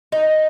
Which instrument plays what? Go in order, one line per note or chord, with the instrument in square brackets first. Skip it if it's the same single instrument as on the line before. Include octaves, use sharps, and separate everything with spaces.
[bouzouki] D#4